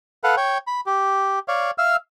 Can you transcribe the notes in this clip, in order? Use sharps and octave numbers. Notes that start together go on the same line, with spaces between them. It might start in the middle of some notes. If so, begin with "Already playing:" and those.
A4 B4 F5 F#5
C#5 G5
B5
G4
C#5 D5 F5
E5 F5 E6 F6